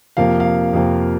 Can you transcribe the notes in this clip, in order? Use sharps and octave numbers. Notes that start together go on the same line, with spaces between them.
F2 C3 F3 A#3 F5
F5
F2 C3 F3 A#3